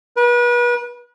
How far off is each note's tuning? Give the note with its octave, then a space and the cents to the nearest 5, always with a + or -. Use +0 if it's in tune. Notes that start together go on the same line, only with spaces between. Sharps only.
B4 -35